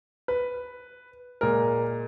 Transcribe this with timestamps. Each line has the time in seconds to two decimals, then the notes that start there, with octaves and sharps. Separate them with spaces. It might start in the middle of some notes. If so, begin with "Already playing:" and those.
0.28 B4
1.41 A#2 G#3 A#4